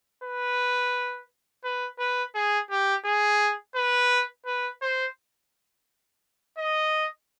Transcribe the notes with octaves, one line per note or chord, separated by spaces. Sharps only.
B4
B4
B4
G#4
G4
G#4
B4
B4
C5
D#5